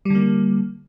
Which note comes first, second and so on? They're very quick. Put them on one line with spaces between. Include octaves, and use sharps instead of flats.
G3 D3 A#3